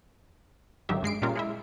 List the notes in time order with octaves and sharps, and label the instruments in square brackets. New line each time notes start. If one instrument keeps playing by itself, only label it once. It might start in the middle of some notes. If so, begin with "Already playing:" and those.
[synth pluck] G#1 D3 D#3 F#3 G4 E5
G2 G#3 C7 D7
A#2 G3 G#3 C#4 F4 A#4
G#3 E4 E5